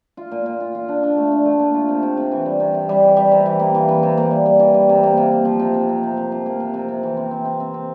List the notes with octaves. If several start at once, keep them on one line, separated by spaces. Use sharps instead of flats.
F4
A#2
A#2
F4
F4
D4
D4
A3
D4
A3
A#2
F4
C3
C3
C3
E3
G3
C3
C3
G3
E3
G3
C3
E3
A#3
E3
E3
C3
A#3
G3
G3
E3
G3
C3
A#3
C3
A#3
F3
C3
C3
C3
C3
C3
F3
A#3
C3
C3
C3
E3
C4
C4
C4
C4
C4